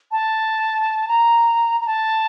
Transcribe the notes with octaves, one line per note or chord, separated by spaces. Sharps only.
A5
A#5
A#5
A5